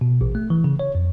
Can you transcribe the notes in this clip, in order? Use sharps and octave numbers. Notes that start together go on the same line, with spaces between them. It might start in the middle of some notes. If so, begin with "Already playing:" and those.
B2
A1
A3
E3
C#3
C#5
F2